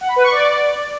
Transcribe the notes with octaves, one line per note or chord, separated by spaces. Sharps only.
F#5
B5
B4
C#6
D5